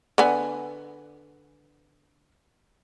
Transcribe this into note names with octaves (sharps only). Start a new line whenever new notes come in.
D3 B3 G#5